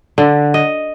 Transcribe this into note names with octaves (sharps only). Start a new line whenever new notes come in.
D3
D#5